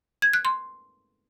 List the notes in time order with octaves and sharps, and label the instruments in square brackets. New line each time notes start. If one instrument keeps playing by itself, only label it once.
[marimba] G#6
F#6
C6